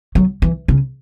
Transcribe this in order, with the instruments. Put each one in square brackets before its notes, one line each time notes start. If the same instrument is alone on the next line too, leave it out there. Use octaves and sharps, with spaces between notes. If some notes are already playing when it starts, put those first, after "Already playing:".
[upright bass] F#3
E3
C#3